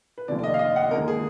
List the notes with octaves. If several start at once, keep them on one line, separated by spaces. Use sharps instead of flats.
B4
F1 D#2 D3 D5
D5
D#5
F5
D#5
F#5
D#2 D3 G#3 A#4
G#4